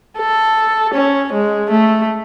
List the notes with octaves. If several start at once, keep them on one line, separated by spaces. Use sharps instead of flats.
A4
C#4
G#3
A3